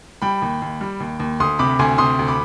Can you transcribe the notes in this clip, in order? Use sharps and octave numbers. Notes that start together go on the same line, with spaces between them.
G3 G5 B5
D#2
D#2
G3
D#2
D#2
D2 C6 D#6
C3 B5 D6
D2 G#5 C6
C3 C6 D#6
D2
B5 D6